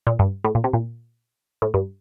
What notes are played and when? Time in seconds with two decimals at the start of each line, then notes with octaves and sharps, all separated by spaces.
0.07 A#2
0.19 G2
0.44 A2
0.55 A#2
0.64 C3
0.73 A#2
1.62 A2
1.74 G2